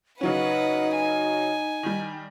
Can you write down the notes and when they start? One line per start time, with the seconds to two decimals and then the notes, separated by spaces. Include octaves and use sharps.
0.21 C#3 F#3 C#4 D#4 B4 F#5
0.96 G#5
1.83 D#3 G3